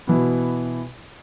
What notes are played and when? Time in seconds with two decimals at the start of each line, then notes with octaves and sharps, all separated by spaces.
0.07 B2 E3 B3